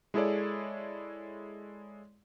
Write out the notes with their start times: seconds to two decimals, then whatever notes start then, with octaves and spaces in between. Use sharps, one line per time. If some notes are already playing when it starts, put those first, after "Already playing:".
0.14 G#3 E4 G#4 A4 C#5 D5